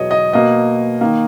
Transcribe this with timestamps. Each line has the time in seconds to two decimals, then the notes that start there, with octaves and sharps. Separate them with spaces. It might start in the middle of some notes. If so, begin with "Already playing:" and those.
Already playing: E2 B2 F#3 C#5 D#5
0.11 D#5
0.33 B2 A#3 D#5
1.01 D#3 A#3